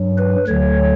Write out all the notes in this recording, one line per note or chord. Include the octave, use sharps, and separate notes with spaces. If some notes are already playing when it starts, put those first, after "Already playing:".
Already playing: G2 F#3
B4
D2 D3 F#3 C#5